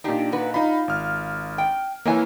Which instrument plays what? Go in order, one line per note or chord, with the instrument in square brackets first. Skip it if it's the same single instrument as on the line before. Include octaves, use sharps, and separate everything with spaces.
[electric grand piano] A#2 D#4 [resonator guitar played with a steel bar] D4 G4
[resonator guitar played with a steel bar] F#4 B4
[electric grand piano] D#4 B5 [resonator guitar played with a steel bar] F4
[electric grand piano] G#1 F6
[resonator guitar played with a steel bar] G5
[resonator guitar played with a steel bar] F2 C#5 G#5 [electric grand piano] E3 A#3